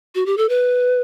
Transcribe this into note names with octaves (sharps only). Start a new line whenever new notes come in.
F#4
G4
A4
B4